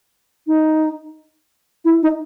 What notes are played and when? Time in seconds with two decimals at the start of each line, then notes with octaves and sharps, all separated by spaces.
0.47 D#4
1.85 E4
2.02 D#4